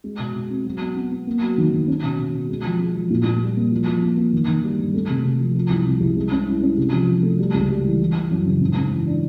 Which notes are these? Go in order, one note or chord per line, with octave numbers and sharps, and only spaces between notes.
G#3
B2
B2
C4
F#3
B3
B3
B3
A#3
F#3
D#3
D#3
C#4
B2
B2
B2
G#3
F3
G#3
F3
A#2
A#2
G3
A#3
F3
F3
A#3
A#3
D#3
D#3
G3
G2
A3
C3
C3
F3
F3
C2
C3
C2
G#3
C#4
E4
C#4
C3
F3
F3
A3
G3
C#2
G3
E3
E3
E3
F#2
C#3
G#2
G#2
E3
D4